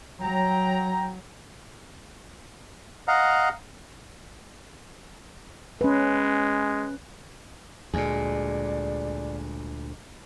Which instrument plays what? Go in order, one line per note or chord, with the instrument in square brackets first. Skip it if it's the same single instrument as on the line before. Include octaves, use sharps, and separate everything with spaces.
[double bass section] F#3 [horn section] G5 A#5
[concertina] D#5 F5 F#5 A#5
[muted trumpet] G#3 [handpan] C#4 B4
[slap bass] D2 A#2 [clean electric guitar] G#3 G#4 [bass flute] D5